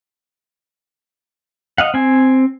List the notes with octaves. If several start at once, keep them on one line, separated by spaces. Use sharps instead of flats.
D#5 F5 F#5
C4 G#5